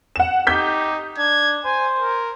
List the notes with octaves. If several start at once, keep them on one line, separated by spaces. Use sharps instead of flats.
F#5 E7
D#4 G4 G6 B6
D4 G#6
C5 G#5
A#4